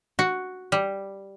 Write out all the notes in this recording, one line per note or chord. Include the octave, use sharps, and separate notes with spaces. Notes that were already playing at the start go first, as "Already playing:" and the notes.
F#4
G3